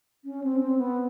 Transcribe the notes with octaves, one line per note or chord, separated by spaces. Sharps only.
C#4
C4
C4
B3